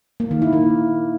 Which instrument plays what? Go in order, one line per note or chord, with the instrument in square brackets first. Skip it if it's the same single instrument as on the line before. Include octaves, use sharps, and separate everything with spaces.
[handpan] A#3
D#3
E4
A#3